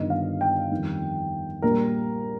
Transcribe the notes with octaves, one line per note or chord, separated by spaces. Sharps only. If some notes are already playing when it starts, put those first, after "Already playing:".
Already playing: G1 G2 D#3 G3 D#5
F5
G5
F2 D#3 G3
A#1 A#2 G3 A#4